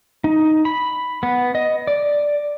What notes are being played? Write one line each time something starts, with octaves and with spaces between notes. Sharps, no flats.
D#4
B5
B3
D#5
D5